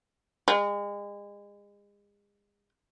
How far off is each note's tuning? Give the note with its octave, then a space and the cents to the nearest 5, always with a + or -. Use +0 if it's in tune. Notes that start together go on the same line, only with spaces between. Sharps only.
G#3 -35